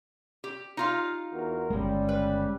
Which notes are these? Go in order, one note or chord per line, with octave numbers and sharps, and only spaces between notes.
G4
D#4 F4 F5
E2 F#4 A#4
G1 C2 C#3 G3 G#3
B4